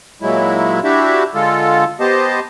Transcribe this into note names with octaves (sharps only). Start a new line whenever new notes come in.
A#2 F#3 G#3 E4
D4 E4 F#4 G4 E5
D3 G#3 F4 A4
B3 G4 C5 D#5 A5